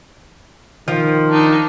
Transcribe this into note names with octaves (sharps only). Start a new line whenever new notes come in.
D#3 F3
D4 D#4